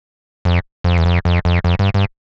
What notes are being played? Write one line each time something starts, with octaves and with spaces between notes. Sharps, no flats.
F2
F2
E2
F2
F2
F2
F2
G2
G2